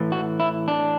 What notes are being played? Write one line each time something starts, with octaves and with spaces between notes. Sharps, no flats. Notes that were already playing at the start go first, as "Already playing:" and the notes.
Already playing: A2 E3
F#4
E4
D4